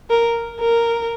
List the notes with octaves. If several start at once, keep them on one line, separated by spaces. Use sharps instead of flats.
A#4
A#4